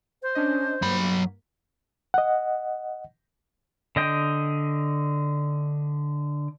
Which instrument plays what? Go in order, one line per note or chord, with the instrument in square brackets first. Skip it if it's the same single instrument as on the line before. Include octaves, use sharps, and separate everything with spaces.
[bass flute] C5
[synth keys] C#4 D4 D#5
[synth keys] G2 A#3 [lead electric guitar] F#3 B5
[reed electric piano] D#5 F#5
[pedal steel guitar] D3 D#5 G5